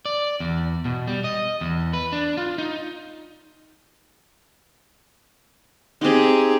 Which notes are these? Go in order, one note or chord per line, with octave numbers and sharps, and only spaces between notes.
D5
E2
B2
G3
D#5
E2
B4
D4
F4
D#4
C4 D#4 G4 G#4